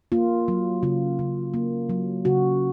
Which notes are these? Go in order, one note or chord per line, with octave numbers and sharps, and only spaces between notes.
A#3 F4
F#3
C#3 F4
C#3
A#3
F#3
C#3 F#4